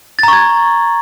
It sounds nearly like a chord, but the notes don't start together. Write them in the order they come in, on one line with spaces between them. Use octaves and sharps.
A6 A#5 C#6 G#6